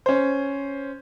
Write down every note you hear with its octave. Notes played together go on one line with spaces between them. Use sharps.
C#4 C5